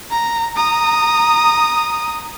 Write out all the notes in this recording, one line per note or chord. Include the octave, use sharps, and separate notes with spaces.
A#5
A#5 D#6